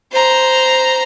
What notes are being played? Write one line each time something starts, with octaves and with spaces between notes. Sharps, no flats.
C5 A#5